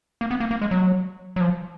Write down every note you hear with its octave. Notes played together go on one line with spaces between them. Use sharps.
A#3
B3
A#3
A#3
G#3
F#3
F#3
F3